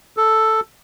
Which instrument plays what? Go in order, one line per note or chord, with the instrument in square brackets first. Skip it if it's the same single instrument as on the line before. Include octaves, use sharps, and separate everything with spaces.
[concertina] A4